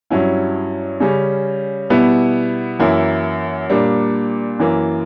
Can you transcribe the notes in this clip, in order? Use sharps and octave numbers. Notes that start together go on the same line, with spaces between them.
G2 F#3 C#4 E4
C#3 G3 C#4
B2 G3 B3 E4
F#2 E3 A#3 E4
A#2 G3 A#3 D4
F#2 E3 A#3